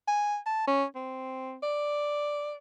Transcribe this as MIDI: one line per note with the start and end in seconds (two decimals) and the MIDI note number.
0.08 0.38 80
0.46 0.65 81
0.67 0.85 61
0.95 1.58 60
1.63 2.55 74